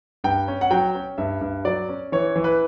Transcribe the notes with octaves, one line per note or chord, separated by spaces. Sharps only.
G2 G5
C#4
F#5
F#3 G5
C#4
G2 E5
G2
F#3 D5
C#4
E3 C#5
E3
B4